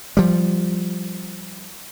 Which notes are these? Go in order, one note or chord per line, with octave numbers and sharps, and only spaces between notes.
F3 G3